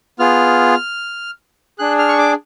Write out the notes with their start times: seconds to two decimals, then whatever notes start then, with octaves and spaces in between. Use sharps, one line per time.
0.19 B3 F4 G#4 F6
1.79 D4 G#4 F#6
1.99 F6
2.08 C#6
2.18 D6